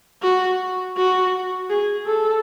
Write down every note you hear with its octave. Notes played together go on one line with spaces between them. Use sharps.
F#4
F#4
G#4
A4